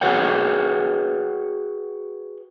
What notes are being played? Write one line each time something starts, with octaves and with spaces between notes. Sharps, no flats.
F#4 G#4 B4 C#5 F#5 G5